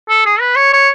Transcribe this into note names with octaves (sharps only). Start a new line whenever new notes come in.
A4
G#4
B4
C#5
C#5